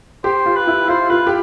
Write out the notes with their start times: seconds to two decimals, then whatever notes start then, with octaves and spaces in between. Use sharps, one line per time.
0.24 G4 C5
0.46 F4
0.56 B4
0.67 E4
0.88 F4 C5
1.10 F4 B4
1.27 G4